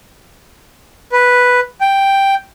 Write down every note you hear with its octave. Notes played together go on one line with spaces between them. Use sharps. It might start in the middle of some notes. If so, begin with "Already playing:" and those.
B4
G5